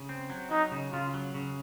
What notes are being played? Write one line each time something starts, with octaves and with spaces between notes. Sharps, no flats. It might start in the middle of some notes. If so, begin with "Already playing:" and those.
Already playing: C#3
C4
F#3
F#3 D#4
C#3
C#3 F4
F#3
C#3